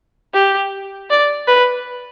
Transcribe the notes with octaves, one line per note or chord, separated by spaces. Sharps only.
G4
D5
B4